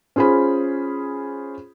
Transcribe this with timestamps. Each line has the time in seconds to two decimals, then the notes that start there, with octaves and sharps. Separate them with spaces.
0.16 C#4 F4 G#4 C5 B5